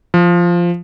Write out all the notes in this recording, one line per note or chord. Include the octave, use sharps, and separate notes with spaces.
F3